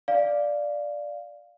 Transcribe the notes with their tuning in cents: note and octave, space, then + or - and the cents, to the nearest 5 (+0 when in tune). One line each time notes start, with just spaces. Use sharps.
D5 +0 F5 +0